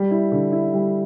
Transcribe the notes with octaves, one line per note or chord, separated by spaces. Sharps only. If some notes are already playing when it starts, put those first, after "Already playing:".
Already playing: G3
E4
D3
E4
G3